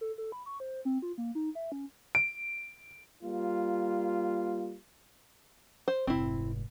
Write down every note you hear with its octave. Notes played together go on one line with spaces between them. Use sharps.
A4
A4
B5
C#6
C5
C4
F4
A#3
D#4
E5
C#4
D7
G3 A#3 F4
C5
F1 G#2 C4 E4